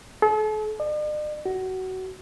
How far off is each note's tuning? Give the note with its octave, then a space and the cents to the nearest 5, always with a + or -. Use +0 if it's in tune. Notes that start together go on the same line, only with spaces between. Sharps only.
A4 -40
D5 +45
F#4 +20